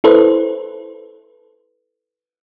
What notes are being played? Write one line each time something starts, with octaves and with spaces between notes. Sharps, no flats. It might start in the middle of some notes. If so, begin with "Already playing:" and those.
E4 A4 B4 C5